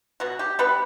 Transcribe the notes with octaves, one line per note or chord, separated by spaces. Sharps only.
B2 F#4
G4
G3 B3 B4